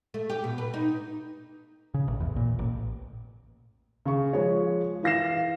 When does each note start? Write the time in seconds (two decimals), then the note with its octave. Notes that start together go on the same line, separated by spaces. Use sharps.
0.14 A3
0.30 G4
0.44 B2
0.58 B4
0.74 D#4
1.94 C#3
2.08 A1
2.20 E2
2.36 A#2
2.59 A1
4.06 C#3 C#6
4.33 F3 G#3 C#5
5.03 E3 F5 A#6 C7 E7